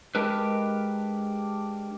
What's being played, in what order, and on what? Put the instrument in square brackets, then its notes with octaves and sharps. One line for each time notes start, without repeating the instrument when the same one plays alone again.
[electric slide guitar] G#3 D4 G4 A#4 B4